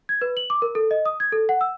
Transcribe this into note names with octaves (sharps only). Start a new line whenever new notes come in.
G#6
B4
F#7
D6
A#4
A4
D#5
D#6
G#6
A4
F#5
E6